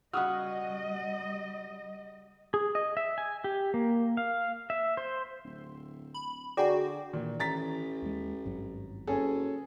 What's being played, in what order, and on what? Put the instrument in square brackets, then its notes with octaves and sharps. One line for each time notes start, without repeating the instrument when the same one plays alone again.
[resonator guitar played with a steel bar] C#3 F#4 [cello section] G3 D#5 [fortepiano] F#5 D#6 F6
[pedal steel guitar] G#4
D#5
E5
G#5
G4
A#3
F5
E5
C5
[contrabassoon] D1
[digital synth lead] B5
[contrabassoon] D3 [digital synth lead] F#4 [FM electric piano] G#4 G5 D6 [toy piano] D5 F#5 A#5
[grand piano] A#2 [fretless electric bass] D#3 E3
[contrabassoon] A1 [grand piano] A#5 A6 B6
[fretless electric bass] D#2 G#3
G#1 G2 F#3
[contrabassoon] F#1 [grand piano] C#4 G#4 A4